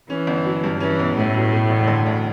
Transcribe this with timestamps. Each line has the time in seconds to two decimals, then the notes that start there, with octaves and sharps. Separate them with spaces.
0.10 E3 C#4
0.27 G1
0.45 F#3
0.64 G2
0.80 E3 C#4
0.99 B1
1.17 A2 A3
1.35 B2
1.52 A3
1.70 E1
1.87 D3
2.06 D2